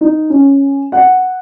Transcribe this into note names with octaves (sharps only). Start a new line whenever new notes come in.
D#4
C#4
F#5